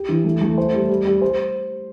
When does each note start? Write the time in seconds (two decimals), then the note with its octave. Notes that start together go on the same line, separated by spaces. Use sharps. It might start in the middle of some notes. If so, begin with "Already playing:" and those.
Already playing: G4
0.09 E3
0.24 A3
0.41 A3
0.58 C5
0.74 G3
0.89 G3
1.05 G3
1.22 C5